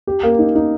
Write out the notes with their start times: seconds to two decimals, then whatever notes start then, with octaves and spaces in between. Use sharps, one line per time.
0.07 G4
0.23 A#3
0.39 D#4
0.55 D#4